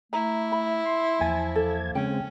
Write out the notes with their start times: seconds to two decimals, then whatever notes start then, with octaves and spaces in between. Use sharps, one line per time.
0.13 A3 E4 A#5
0.52 B5
0.86 C6
1.21 E2 F3 A#3 G#5 A5 G#6
1.55 A4
1.95 C#3 G#3 C4 C#4 G5